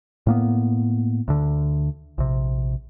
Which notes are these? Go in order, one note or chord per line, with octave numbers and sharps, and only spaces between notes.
A2 A#3 B3
D2 D3
A#1 C3